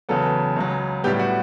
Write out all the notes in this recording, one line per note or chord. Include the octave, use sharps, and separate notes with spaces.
E2 C#3 F#3 B3 A4
C#2 C#3 F#3
A2 G3 B3 G4
F#4